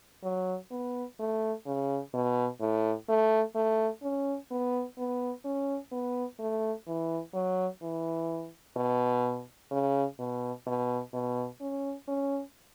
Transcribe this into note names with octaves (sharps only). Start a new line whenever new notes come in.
F#3
B3
A3
C#3
B2
A2
A3
A3
C#4
B3
B3
C#4
B3
A3
E3
F#3
E3
B2
C#3
B2
B2
B2
C#4
C#4